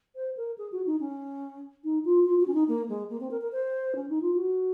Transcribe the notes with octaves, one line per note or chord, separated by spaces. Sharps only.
C5
A#4
G#4
F#4
D#4
C#4
D#4
F4
F4
F#4
C#4
D#4
A#3
G#3
A#3
C4
A#4
A#4
C5
C#4
D#4
F4
F#4